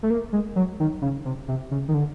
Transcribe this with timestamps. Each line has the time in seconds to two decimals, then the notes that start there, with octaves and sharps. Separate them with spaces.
0.03 A3
0.10 A#3
0.33 G#3
0.56 F#3
0.80 D#3
1.02 C#3
1.25 C3
1.48 C3
1.71 C#3
1.88 D#3
1.94 D3